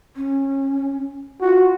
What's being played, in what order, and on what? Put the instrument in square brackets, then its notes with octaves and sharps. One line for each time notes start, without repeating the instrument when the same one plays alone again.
[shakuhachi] C#4
[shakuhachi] F4 [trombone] F#4